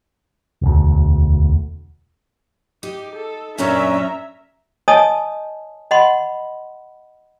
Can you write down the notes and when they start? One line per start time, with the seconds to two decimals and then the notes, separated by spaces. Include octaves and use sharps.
0.62 E1 D2
2.83 D#4 G4
3.15 A4
3.58 F#2 A#2 C#4 D4 E5 A#5
4.88 C#5 D#5 G#5 A5 D#6
5.91 D#5 F#5 B5 C6